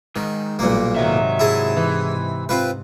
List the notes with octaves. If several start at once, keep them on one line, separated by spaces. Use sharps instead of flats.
G#2 D#3
B1 A#2 G3 A#3
G#2 C3 D#3 F#3 E5
E4 G#4 A5
E3
C4 F4 B4